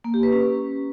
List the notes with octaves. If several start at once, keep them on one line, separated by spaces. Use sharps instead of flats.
A#3
G4
B4
C#4